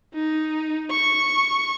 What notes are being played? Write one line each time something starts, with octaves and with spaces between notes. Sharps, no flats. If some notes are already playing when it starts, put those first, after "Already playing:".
D#4
C#6